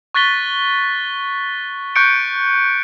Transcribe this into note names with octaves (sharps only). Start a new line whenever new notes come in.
C#6 F#6 A6 B6 G7
C#6 F#6 G6 C#7 D7